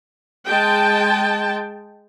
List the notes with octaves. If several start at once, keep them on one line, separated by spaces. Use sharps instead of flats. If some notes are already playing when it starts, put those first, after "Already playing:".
G#3 G5 A5